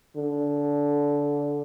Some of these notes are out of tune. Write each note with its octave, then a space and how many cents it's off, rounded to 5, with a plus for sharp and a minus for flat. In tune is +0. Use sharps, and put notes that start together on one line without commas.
D3 -20